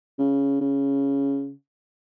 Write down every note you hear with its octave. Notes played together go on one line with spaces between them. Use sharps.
C#3
C#3